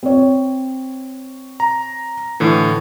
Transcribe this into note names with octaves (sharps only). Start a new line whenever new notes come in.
C4 C#5
A#5
A2 D3 E3